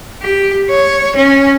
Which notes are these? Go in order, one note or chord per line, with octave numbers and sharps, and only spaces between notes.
G4
C#5
C#4